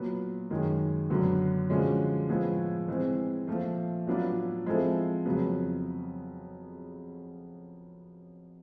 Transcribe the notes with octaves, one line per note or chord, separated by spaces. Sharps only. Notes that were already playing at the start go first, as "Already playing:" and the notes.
Already playing: A#2 F#3 B3
F#2 D#3 G#3
F#2 D3 F#3 B3
D3 F3 G#3 C#4 F#4
A2 F3 G#3 B3
E3 G#3 C4
A#2 F3 A3
A2 F#3 B3 D4 F4
F3 G#3 C4 E4 A4
F2 C#3 F#3 B3